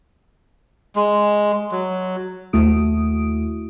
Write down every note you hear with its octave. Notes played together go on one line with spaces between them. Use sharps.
G#3
F#3
D#2 A3 E4 F#4 D#6 D7